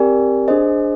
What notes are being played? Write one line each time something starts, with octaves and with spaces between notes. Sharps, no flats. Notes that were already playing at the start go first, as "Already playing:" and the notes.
Already playing: C4 G4 A#4 D5 G#5
D4 G#4 C5 D#5